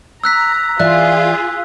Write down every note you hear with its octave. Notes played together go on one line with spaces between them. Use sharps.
A#5 E6 F#6 B6
E3 F4 G#4 D5 E5 F#6